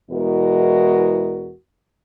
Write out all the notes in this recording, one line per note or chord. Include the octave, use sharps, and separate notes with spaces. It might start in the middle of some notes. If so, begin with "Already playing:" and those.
E2 B2 G#3 E4 F#4 A#4